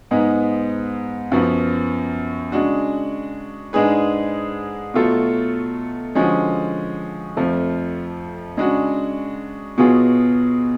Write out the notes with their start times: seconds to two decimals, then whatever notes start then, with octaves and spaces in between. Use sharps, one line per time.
0.11 G#2 G#3 B3
1.32 F#2 F3 B3 F#4
2.52 C#3 G#3 D4 F#4
3.73 G#2 G#3 D4 G#4 B4
4.94 B2 F#3 A3 F4 A4
6.15 D3 F3 G#3 C#4 F#4
7.37 F2 F3 A3
8.57 C#3 G#3 D4 F#4
9.78 B2 F#3 B3 F4 G#4